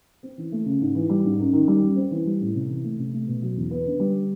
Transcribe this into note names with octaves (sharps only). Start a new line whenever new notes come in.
C4
E3
A3
C#3
G#2
E3
G3
G#2
F#2
D#3
G3
F#2
C4
E3
G3
A2
C3
E3
A3
C3
A3
B2
F#3
E2
B3
D3
G3